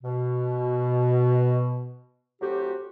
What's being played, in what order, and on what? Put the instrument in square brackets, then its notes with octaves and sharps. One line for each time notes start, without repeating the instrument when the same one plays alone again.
[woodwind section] B2
A2 F#3 C4 F#4 G4